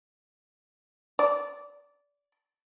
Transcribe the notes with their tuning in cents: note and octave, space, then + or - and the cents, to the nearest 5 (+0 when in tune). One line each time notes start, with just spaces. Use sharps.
D5 -20